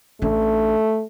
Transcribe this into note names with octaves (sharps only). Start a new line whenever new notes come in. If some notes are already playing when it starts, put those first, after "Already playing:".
A1 A3 D4